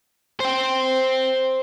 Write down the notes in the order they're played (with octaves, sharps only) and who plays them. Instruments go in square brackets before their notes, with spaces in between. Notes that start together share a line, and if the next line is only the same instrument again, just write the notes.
[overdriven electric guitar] C5 G5